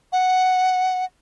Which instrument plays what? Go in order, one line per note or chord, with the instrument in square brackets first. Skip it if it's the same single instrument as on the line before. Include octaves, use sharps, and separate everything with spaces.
[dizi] F#5